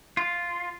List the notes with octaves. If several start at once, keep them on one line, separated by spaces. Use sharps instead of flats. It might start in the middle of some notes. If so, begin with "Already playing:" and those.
F4